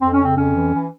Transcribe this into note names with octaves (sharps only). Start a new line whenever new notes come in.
F2 C4
C#4
C#3 C4
F2 C#4
E3
E3